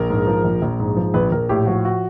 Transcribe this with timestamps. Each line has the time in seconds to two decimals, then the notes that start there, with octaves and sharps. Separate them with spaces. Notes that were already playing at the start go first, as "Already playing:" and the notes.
Already playing: A#1 A#4
0.10 G#2
0.27 F3
0.44 A#1
0.62 A#1
0.80 G#2
0.96 F3
1.14 A#1 B4
1.32 A#1 A#4
1.49 A2 G4
1.66 F3 F#4
1.85 F#4